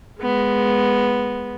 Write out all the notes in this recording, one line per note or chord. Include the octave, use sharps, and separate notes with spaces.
G#3 B3